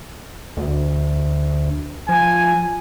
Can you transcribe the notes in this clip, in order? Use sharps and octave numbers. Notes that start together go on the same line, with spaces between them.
D2
F3 G#5